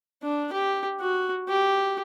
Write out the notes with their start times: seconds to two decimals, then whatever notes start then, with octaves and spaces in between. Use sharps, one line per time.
0.23 D4
0.53 G4
1.01 F#4
1.49 G4